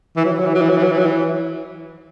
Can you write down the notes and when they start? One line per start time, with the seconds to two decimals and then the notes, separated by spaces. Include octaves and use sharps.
0.16 E3
0.25 F#3
0.31 E3
0.39 F#3
0.46 E3
0.55 F#3
0.61 E3
0.70 F#3
0.77 E3
0.84 F#3
0.92 E3
0.99 F#3
1.06 E3